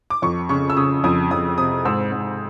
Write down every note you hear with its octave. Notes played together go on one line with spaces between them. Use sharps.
D6
F2 C#6
C#3 C#6
E6
C#3 D#6
F2 D#6
F2 D#6
C3 D#6
G#2 E6
G#2